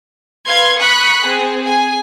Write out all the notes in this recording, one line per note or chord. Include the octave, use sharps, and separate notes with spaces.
B4 F5 C6 G#6
B5 C#6 D#6 F#6 B6
C4 G#4
G#4 G#5